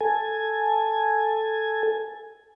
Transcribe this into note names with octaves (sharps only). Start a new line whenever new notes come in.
A4 G#5